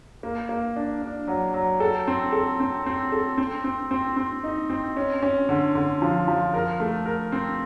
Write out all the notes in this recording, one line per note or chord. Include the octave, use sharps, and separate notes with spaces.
A#3
A#3
D4
D4
F#3
F#3
A4
C4
A4
C4
C4
A4
C4
C4
C4
C4
D#4
C4
C#4
C#4
D3
D3
F3
F3
A#4
A3
A#4
C4